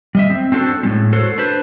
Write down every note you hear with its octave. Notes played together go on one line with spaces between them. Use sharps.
G3 D#5 E5
C4
C4 D4 F#4 A4 C5
A2 G#3 C4
F#4 A4 C5 C#5
D4 B4 C5